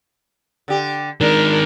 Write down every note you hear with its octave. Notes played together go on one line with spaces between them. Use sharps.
D3 G4
D#3 G#3 D4 A#4